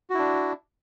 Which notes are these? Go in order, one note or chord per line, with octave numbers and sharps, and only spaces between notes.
D4 E4 F#4